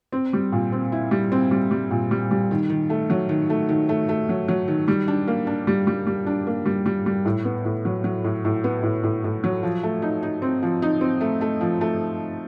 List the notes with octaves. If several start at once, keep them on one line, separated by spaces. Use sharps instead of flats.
C4
G3
A#2
C4
E4
G3
C4
G3
G3
A#2
G3
G3
D#3
D#3
A3
F#3
D#3
A3
D#3
A3
A3
F#3
F#3
D#3
G3
D4
A#3
D4
G3
G3
G3
D4
A#3
G3
G3
G3
A2
B3
A2
F#3
F#3
A2
A2
B3
A2
A2
A2
F#3
F3
A3
D#4
D#4
C4
F3
D#4
C4
A3
A3
F3
A3